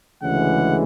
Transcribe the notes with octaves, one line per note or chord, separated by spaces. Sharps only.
D2 C#3 E3 G#3 F#5